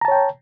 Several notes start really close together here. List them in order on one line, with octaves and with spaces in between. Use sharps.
A#5 A5 C#5 G5